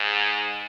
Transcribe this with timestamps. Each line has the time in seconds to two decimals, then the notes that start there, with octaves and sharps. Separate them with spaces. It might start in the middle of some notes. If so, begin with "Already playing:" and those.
Already playing: G#2